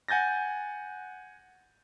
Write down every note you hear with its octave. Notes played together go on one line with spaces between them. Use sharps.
F#5 G#5 G6 A6 A#6